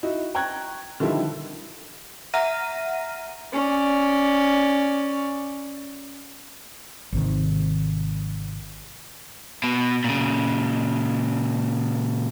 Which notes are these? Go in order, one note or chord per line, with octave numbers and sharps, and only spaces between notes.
D#4 E4 F#4
G5 A#5 C#6 F#6 G#6
D3 D#3 F3 G3 E4
E5 F#5 A#5 F6 A#6 D#7
C#4 D5
G#1 C3 D#3
B2
A#2 C#3